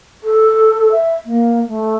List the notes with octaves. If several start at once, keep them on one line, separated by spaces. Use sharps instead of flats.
A4
E5
A#3
A3